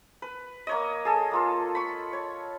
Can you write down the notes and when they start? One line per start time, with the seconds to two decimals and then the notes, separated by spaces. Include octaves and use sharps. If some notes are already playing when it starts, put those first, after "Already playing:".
0.22 B4
0.67 A#3 C#5 D#5
1.05 G#4 A4
1.31 A#3 F4 A4
1.75 B5 C#6
2.13 C#5